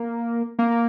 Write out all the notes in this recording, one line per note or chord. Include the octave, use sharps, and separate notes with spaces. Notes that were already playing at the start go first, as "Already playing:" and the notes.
Already playing: A#3
A#3